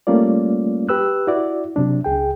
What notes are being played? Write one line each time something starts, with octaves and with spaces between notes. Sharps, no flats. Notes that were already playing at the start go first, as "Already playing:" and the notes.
G3 A3 A#3 C#4 F4 D5
G4 B4 E6 F#6
E4 F#4 D5
C3 F#3 D4
C#2 G#4 G5